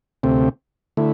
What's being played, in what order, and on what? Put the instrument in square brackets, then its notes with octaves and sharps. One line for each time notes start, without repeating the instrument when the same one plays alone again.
[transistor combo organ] D2 C3 A3 C4
D3 A3 E4